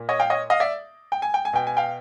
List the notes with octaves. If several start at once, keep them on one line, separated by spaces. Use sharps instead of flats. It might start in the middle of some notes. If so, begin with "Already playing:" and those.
Already playing: A#2
C#5 D#5
F5 G5
C#5 D#5
D#5 F5
D5 E5
G5
G#5
G5
G#5
B2 G5
G#5
F5 G5